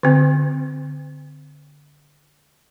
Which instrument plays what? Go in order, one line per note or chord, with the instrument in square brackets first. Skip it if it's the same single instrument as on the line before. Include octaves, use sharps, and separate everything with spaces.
[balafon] D3 C4